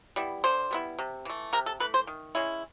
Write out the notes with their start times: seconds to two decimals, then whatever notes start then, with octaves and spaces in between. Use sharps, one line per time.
0.16 G3 B3 E4
0.44 D3 C5
0.71 G3 B3 E4
0.99 C3
1.25 E3 A3
1.53 C3 A#4
1.66 A4
1.80 E3 A3 B4
1.94 C5
2.07 D#3
2.35 G#3 C#4 E4